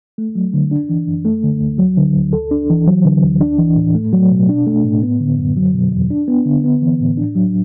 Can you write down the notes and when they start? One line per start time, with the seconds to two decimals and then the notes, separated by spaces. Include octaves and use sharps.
0.18 A3
0.35 F#3
0.53 D3
0.71 D4
0.89 E3
1.07 F#2
1.25 A3
1.43 D3
1.61 D2
1.79 F#3
1.97 D3
2.15 D2
2.33 A4
2.51 D4
2.70 E3
2.87 F#3
3.05 D3
3.23 D2
3.41 D4
3.59 E3
3.76 A2
3.95 A3
4.13 F#3
4.30 B2
4.49 D4
4.67 A3
4.85 A2
5.03 B3
5.20 D3
5.38 F#2
5.56 F#3
5.74 B2
5.92 E2
6.10 D4
6.28 B3
6.46 D3
6.64 B3
6.82 E3
7.00 A2
7.18 D4
7.35 F#3